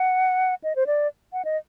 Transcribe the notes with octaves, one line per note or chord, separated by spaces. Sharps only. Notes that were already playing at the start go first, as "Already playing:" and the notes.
Already playing: F#5
D#5
C5
D5
F#5
D#5